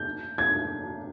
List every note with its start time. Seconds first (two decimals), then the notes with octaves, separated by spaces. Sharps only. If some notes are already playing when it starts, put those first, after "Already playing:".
Already playing: G6
0.38 G#6